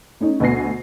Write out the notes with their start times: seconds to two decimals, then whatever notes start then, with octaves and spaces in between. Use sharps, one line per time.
0.20 A3 C#4 D#4
0.40 D2 B2 B4 G#5 A#6 C7